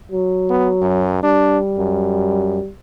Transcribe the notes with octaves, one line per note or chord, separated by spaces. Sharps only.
F#3
B3
F#2
G3 D4
F#2